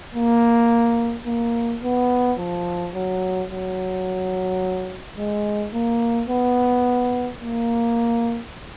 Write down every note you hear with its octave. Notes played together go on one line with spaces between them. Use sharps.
A#3
A#3
B3
F3
F#3
F#3
G#3
A#3
B3
A#3